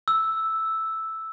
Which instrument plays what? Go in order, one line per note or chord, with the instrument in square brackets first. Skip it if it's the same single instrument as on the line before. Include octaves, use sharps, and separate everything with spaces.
[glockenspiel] E6